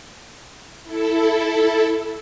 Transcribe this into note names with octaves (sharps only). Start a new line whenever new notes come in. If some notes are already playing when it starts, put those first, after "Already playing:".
E4 A4